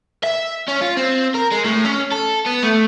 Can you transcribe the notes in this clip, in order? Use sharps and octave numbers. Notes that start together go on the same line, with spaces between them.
E5
C#4
F4
C4
A#4
G#3
A2
C#4
A4
B3
A3